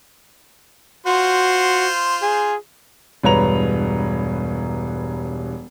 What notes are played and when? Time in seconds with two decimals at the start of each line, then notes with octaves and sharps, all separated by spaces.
1.06 F4 F#4 C5
2.22 G#4
3.23 E1 G2 B4 C#5 A#5 F7